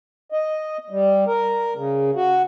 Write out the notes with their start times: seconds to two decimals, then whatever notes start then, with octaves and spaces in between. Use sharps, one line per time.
0.32 D#5
0.90 G3
1.27 A#4
1.76 C#3
2.16 F#4